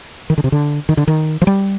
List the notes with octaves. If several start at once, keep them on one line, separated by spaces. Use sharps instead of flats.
D#3
D3
C3
D3
D#3
D3
D#3
F3
G3